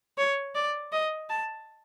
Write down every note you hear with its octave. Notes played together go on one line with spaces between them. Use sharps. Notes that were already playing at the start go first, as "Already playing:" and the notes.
C#5
D5
D#5
A5